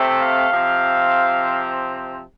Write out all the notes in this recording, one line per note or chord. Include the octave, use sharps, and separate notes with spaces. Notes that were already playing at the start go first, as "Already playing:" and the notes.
Already playing: C3 A3 C4
F5
C3 F3 C4